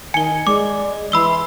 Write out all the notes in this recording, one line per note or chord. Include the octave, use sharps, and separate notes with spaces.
D#3 G#5 C#7 G7
G#3 D5 D6
E3 B5 C6 E6 G7